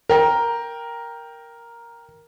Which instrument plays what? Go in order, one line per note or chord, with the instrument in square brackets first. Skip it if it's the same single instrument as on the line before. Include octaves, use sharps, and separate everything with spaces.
[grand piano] A#4 G5 A#5